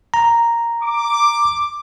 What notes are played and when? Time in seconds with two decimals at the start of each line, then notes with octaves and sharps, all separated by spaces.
0.14 A#5
0.83 D6